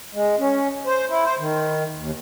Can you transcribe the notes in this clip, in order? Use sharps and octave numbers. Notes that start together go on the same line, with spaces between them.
G#3
C#4
C5
E4
C5
D#3
D#2